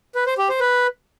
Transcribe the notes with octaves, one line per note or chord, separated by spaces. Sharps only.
B4
C5
G4
C5
B4